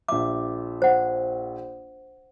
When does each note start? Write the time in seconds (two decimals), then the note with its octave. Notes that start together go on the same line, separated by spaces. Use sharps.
0.08 A#1 E5 D6
0.82 C5 F#5